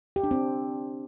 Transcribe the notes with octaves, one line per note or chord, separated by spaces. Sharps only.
G4
D4
C4